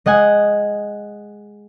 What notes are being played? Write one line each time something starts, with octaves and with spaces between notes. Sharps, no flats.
G#3 D#5 F#5 G#5